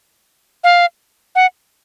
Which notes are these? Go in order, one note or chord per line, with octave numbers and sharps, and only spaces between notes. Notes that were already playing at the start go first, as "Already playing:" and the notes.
F5
F#5